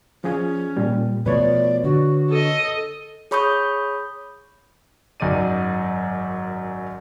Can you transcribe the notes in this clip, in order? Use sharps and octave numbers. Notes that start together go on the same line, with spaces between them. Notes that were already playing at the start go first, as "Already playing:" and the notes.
F3 C#4 G#4
A#2 G3
B2 F3 A3 B4 C#5 D5
D3 F#4
A4 D#5
G#4 C#5 B5 C#6 D#6 G6
G#1 F#2 D#4 D5 D#7